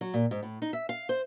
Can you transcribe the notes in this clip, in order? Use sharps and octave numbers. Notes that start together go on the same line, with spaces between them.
F#3
A#2
G#2
A2
D#4
E5
F5
C5